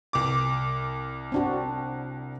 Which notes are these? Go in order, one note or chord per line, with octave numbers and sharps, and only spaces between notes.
C2 D6
C4 D4 F#4